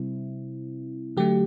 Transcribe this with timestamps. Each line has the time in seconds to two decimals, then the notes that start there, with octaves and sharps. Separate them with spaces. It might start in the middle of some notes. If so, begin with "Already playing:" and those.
Already playing: C3 G3 C4 E4
1.17 D3 F#3 A3 G4